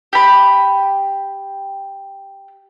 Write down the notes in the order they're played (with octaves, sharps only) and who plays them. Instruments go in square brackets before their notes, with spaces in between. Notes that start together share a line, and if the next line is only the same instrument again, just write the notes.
[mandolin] G4 B5